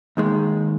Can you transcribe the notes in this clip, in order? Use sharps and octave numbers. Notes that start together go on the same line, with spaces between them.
D#2 D#3 G#3